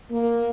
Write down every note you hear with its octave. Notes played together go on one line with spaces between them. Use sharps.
A#3